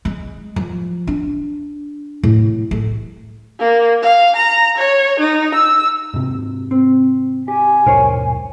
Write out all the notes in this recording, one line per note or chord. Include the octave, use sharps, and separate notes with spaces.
G#3
F3
D4
A2
A3
A#3
F5
A#5
C#5
D#4
E6
G#2 C3
C4
G4 G#5
D#1 B1 G#2 A#4 C5 C#5